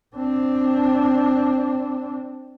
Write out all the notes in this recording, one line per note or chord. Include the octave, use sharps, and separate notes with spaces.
C4 D4